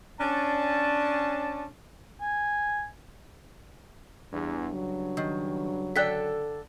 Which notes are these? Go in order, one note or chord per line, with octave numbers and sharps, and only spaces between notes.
C#4 D4 A5
G#5
E2 G2
C#3 F#3
D#3
D3 A4 D5 G5 F#6 B6